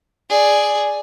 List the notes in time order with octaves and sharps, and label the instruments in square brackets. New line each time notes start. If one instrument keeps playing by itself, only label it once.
[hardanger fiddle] G#4 D5